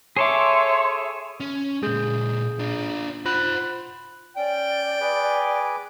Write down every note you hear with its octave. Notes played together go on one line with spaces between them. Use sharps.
G#4 A4 C#5 E5 C6 D6
C#4
A#2 G#3 G#4 G6
D4 F4
F4 C5 F#5 B5 F#6
C#4 D5 G5
G#4 B4 D6